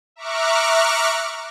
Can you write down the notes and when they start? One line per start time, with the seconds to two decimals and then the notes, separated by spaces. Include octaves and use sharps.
0.16 E5 A#5 C#6 D6 F6 F#6